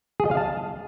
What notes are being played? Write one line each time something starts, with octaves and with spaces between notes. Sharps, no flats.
G#4
D#5
F5
A5